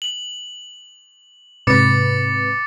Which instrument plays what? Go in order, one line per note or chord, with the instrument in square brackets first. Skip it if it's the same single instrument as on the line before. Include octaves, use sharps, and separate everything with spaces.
[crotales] F#7
[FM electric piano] G#2 C3 B4 [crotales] D6 A6 C#7